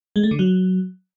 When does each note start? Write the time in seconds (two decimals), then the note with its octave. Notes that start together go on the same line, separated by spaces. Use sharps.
0.16 G#3
0.23 A3
0.31 D3
0.39 F#3